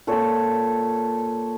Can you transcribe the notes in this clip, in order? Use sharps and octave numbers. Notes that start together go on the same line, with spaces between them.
A#2 A4 C#5